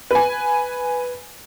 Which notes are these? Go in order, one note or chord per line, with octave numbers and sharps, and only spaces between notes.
B4 G#5